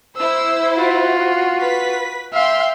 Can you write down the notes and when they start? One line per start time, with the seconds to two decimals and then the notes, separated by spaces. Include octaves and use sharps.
0.17 E4 C5 E6
0.75 F4 F#4
1.60 B4 B6
2.33 E5 F5 G5 C6